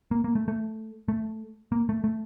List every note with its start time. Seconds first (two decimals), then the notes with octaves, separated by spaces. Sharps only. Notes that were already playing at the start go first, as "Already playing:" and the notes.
0.11 A#3
0.24 A#3
0.35 A3
0.48 A3
1.08 A3
1.72 A#3
1.89 A3
2.04 A3